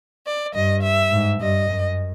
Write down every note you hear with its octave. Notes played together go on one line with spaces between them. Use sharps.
D5
G2 D#5
E5
G#2
G2 D#5
F#2